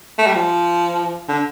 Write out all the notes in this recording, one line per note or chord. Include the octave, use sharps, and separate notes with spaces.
A3
G3
F3
D3